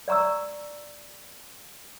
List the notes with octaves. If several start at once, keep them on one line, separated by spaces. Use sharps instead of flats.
D5 F#5 A#5 C#6 E6